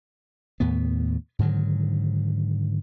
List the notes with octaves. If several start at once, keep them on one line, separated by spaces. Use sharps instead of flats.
D#2 A2 B3
G#2 D3 D#3 F#3